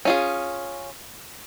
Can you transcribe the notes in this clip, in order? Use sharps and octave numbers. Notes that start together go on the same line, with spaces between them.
C#4 F4 G#4